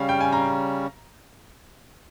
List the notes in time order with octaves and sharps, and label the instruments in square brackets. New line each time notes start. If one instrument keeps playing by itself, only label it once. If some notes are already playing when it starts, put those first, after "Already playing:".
Already playing: [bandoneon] C#3 G3 C#4 [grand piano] F5
[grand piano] G5
G#5
A#5